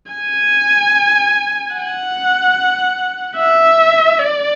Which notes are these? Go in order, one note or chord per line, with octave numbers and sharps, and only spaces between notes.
G#5
F#5
E5
D5